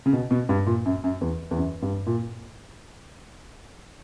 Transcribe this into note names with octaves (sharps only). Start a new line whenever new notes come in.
C#3
B2
B2
G2
A#2
F#2
F#2
E2
E2
F#2
G2
A#2